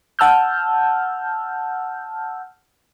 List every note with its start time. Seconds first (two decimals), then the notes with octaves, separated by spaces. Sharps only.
0.19 F#5 A5 E6 F6 G6